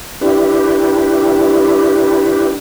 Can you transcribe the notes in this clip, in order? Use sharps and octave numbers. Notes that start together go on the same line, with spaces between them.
D4 E4 G4 B4